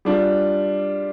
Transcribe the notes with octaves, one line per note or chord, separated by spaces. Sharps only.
G3 D4 F4